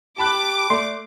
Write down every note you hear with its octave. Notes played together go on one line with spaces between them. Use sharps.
G4 A5 B5 D6 F#6
A3 D5 C6